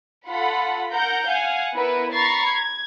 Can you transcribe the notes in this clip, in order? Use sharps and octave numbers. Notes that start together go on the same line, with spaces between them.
F4 A4 F#5 B5
A#4 F#5 A#5 G6
F5 F#5 G#5
B3 E4 A#4 B4
A#5 B5 C#6 A6 C7
G#6